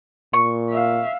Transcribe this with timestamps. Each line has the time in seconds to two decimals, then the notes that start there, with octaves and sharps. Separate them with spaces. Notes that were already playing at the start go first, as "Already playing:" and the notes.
0.33 A#2 C#6
0.71 E5 F5